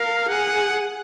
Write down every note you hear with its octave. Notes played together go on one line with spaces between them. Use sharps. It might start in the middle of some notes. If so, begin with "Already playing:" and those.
Already playing: A#4 F5
G#4 F#5